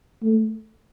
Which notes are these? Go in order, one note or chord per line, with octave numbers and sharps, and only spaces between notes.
A3